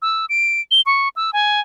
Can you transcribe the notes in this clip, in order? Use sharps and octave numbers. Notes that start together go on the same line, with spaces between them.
E6
D7
G7
C#6
E6
G#5